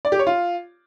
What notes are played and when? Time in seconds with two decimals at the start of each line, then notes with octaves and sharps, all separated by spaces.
0.05 D5
0.12 G4
0.19 C#5
0.27 F4